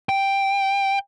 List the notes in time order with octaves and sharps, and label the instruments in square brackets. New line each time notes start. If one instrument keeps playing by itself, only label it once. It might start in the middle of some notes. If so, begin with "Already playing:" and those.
[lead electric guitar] G5